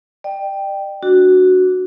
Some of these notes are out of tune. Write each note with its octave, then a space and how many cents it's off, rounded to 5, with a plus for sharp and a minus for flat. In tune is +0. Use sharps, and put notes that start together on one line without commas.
D5 +40 G5 +0
D4 -10 F#4 +0